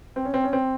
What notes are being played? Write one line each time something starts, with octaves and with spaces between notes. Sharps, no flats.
C4
C#4
C4
C#4
C4